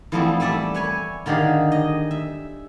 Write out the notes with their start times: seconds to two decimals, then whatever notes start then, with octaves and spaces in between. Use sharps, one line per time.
0.12 E3 F3 G3 A3 B3 C4
0.40 G3 A3 D5 E5
0.74 B4 C#5 G#5
1.26 D3 D#3 G4 G#4 F5
1.72 D#5
2.11 E5